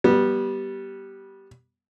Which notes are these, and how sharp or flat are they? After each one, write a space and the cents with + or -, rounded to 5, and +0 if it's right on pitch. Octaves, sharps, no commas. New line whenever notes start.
G3 -10 B3 -20